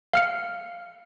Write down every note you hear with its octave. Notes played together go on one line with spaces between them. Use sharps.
F5 F6 C#7